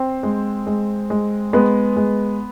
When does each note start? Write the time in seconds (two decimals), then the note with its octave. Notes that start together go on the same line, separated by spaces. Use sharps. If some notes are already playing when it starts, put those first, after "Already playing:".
Already playing: C4 C5
0.23 G#3
0.67 G#3
1.10 G#3
1.53 G#3 B3 B4
1.96 G#3